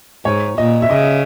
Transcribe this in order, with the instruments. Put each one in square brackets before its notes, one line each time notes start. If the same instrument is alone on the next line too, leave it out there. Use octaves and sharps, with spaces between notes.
[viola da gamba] G#2 [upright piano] C#5
[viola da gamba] A#2 [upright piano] D#5
[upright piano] E5
[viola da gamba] C#3 [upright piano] D#5